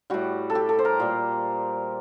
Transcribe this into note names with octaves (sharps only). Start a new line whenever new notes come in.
A2 G3 F#4
A4
G4
A4
C5
A#4
A#2 G3